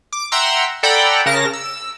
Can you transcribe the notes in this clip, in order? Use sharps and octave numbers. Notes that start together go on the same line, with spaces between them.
D6
E5 F#5 G5 A#5 C6 E6
A4 D5 F#5 G5 A#5 B5
C#3 A#4 A5 A#6
E6